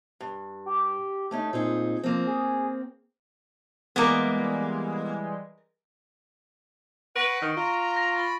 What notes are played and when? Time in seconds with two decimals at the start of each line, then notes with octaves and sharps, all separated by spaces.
0.20 G2
0.66 G4
1.31 A3 C#4 D#4
1.53 A#2 C4 D#4 G#4
2.03 F3 A#3 C4
2.27 G#4
3.96 E3 G3 G#3 A#3 B3 A#4 D6 D#6
7.16 B4 F#5 C#6 A#6 D7
7.42 D#3
7.57 F4 A#5
7.96 A#6
8.16 B5 A6